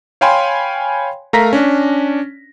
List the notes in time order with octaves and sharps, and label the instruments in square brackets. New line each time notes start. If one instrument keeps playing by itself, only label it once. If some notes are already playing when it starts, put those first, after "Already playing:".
[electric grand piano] C#5 F5 G5 G#5 B5 C6
A3 A#4 F5 A#5 A#6 B6
C#4 D4